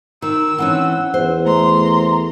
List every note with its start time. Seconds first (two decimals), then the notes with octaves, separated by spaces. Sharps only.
0.22 D#3 E6
0.58 E3 C4 C#4 F#5
1.14 E2 C5
1.45 A3 A#5 C6